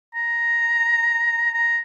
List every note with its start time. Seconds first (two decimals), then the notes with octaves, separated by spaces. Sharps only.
0.14 A#5
1.54 A#5